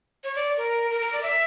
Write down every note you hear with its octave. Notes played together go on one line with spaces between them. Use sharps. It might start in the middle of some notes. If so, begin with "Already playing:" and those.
C#5
D5
A#4
A#4
A#4
D5
E5